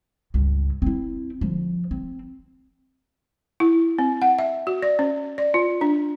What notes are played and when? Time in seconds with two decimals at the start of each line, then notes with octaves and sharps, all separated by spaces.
0.34 C#2 G2
0.82 C4 E4
1.41 D3 F3
1.91 C4
3.60 E4
3.98 C4
4.22 F#5
4.39 E5
4.67 F#4
4.82 D5
4.99 C#4
5.38 D5
5.54 F4
5.81 D4